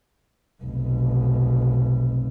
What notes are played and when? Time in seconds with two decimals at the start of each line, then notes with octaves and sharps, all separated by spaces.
0.63 F1 B1